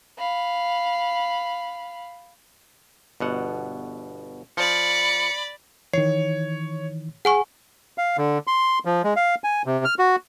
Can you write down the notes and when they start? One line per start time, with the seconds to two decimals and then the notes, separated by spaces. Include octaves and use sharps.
0.18 F5 B5
3.20 G1 B2 F#5
4.57 F3 D5 B5 C#7
5.93 D#3 E3 C#5 C7
7.25 G#4 F#5 G#5 C#6
7.98 F5
8.18 D3
8.47 C6
8.85 F3
9.04 G#3
9.16 F5
9.44 G#5
9.66 C3
9.85 F6
9.99 F#4